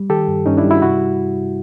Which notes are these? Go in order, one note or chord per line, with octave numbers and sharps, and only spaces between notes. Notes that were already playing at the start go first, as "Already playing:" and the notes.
Already playing: G3
D#3 G4 A4
G2
G2 C#4 D#4
D4 E4
G3
E4 F#4
C3 E4 F#4